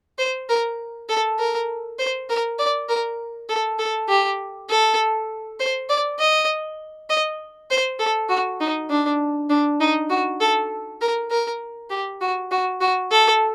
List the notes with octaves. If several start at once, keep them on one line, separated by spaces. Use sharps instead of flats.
C5
A#4
A4
A#4
C5
A#4
D5
A#4
A4
A4
G4
A4
C5
D5
D#5
D#5
C5
A4
F#4
D#4
D4
D4
D#4
F#4
A4
A#4
A#4
G4
F#4
F#4
F#4
A4